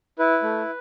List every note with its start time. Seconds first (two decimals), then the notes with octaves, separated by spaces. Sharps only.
0.19 E4 B4
0.43 A3